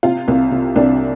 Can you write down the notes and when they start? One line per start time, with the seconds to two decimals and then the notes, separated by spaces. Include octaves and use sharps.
0.03 C3 F4
0.28 C2
0.51 C3
0.76 C2 D4